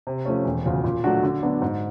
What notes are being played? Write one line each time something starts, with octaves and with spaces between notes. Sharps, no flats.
C3
F3 A3 C#4
E1
D2 C#3 F3
A#2
F#3 A3 D4 F#4
D3
F#3 B3 D4
G#2